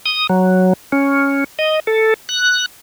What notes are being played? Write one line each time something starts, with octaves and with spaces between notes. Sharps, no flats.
D#6
F#3
C#4
D#5
A4
F#6